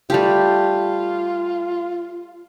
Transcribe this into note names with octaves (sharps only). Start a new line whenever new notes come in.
G3 A3 F4 G4